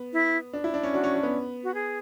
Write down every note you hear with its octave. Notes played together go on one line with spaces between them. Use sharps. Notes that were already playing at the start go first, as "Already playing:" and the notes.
Already playing: B3
E4
D4
E4
D4
C#4
D4 F#4
C#4
D4
B3
F#4
G#4